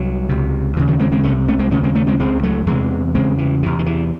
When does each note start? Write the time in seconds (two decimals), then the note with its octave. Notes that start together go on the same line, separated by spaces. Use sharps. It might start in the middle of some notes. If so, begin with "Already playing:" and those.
Already playing: C2 F#3
0.29 C#2 C3
0.77 D#2 C#3 E3
0.87 D#3 F#3
0.99 G#3 C4
1.12 G#3 C4
1.23 C2 C3 A3 C#4
1.48 A3 C#4
1.59 G#3 C4
1.71 D#2 C#3 A3 C#4
1.83 G#3 C4
1.95 A3 C#4
2.07 G#3 C4
2.20 C#2 C#3 G#3 C4
2.43 F#3 A3
2.67 E2 C3 E3 G#3
3.15 E2 C#3 G#3 C4
3.38 E3
3.63 E2 C3 E3
3.79 D#3
3.86 E3